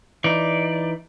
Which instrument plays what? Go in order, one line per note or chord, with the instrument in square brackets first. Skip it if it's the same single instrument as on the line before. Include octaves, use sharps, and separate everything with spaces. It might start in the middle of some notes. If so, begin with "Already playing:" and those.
[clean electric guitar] E3 D#4 [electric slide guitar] D5